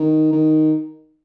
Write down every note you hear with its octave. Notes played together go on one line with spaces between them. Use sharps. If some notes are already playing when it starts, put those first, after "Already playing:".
Already playing: D#3
D#3